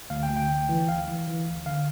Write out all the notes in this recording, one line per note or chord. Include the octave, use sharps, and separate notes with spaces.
D2 F5
G5
D2
G5
D2
E3
D2 F5
E3
E3
D2
D3 F5